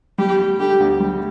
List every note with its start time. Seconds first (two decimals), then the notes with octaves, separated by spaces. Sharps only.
0.18 G3 G4
0.39 G3
0.59 D3 G4
0.80 D2
1.00 G3